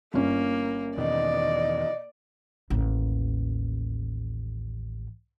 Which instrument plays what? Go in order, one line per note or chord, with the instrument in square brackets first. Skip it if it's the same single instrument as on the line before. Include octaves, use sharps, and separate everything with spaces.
[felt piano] G1 C#4 [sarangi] A#3
[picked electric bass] E2 B2 D#3 [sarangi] D5 [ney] D#5
[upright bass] A1 D#2